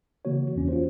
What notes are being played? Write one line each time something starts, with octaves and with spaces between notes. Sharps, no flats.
C#3 E3 A#3 F#4 C#5
E2 E3 C#4
F4 F#4 C5